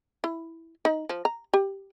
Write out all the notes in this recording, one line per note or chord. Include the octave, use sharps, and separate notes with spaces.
E4
D#4
F3
A#5
G4